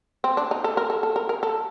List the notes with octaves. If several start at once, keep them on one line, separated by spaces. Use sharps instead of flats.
C4
D4
D#4
A4
A#4
A4
A4
A#4
A#4
A4